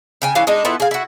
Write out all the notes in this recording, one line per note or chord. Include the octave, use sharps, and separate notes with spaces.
C#3 G5 G#5
E3 C#4 D4 F5
G#3 D4 D#4
B3 E4 F4 A4
G#4 F5
E4 F#4